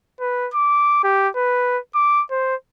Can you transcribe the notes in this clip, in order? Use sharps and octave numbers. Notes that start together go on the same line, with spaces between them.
B4
D6
G4
B4
D6
C5